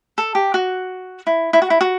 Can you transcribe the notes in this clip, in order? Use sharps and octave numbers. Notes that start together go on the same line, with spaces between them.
A4
G4
F#4
E4
E4
F#4
E4
F#4